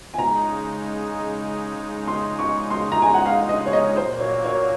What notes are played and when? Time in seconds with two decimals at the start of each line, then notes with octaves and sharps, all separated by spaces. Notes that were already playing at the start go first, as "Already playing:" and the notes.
0.14 G#5
0.18 C#3 G#3 D#4 A#5
2.08 C6
2.39 C#6
2.70 C6
2.92 A#5
3.02 G#5
3.14 F#5
3.26 F5
3.49 D#5
3.66 C#5
3.73 D#5
3.96 A#2 F#3 A#3 C5
4.20 C#5
4.45 C#5